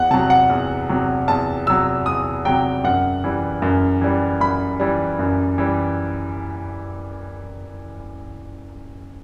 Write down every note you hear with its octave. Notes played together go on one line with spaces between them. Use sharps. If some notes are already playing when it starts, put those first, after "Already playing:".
Already playing: E2 F#5
C3 F#3 A5
F#5
E2
C3 F#3
E2 A5
C3 F#3 E6
E2 D#6
C3 F#3 G5
F#2 F#5
E3 G3
F#2
E3 G3
F#2 B5
E3 G3
F#2
E3 G3